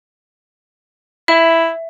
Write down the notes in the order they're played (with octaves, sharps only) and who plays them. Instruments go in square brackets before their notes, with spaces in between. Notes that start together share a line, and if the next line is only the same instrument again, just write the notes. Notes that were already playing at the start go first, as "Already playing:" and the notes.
[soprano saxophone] E4 [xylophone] E5